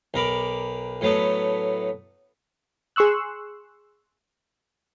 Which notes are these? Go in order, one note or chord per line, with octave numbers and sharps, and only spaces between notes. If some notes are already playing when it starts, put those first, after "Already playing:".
B1 A#4 B5 D6
A2 F#3 A3 B3
G#4 C6 C#6 E6 F#6